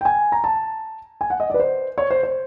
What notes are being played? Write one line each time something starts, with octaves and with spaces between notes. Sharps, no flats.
G5
G#5
A#5
A5
G#5
F#5
D#5
D5
B4
C5
C#5
C5
C5